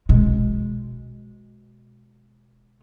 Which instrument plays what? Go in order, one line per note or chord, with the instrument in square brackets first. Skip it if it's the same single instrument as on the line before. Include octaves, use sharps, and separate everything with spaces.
[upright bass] B2 G#3